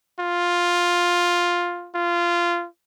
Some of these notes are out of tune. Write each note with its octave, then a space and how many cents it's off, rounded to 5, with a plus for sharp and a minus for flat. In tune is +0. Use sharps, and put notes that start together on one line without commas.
F4 +5
F4 -15